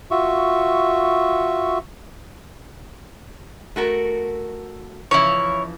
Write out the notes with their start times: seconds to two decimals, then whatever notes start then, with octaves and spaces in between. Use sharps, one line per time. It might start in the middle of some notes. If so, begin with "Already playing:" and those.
0.11 F4 F#4 E5 C#6
3.76 A3 F#4 A#4
5.11 C#3 E3 F3 E4 C#5